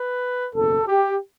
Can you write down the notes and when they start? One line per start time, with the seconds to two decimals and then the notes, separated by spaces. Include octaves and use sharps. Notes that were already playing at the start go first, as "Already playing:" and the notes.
Already playing: B4
0.54 F#1 E2 B2 A4
0.86 G4